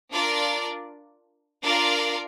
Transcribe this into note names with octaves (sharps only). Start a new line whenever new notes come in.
D4 F4 A#4 D5
D4 F4 A#4 D5 F5